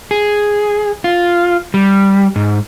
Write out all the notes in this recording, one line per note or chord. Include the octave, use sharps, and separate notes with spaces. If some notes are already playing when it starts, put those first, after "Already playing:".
G#4
F4
G3
G#2